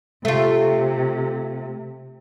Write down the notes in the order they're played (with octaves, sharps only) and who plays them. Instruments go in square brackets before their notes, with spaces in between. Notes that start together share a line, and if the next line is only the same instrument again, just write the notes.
[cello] C3 [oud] A3 F4